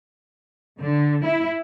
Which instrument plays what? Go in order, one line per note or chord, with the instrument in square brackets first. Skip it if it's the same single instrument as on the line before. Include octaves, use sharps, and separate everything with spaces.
[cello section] D3
E4